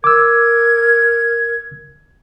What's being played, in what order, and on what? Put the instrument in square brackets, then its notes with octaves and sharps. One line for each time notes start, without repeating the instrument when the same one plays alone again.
[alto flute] A#4 [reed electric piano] D6 E6 [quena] G#6